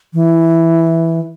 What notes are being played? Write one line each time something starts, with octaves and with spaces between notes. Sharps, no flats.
E3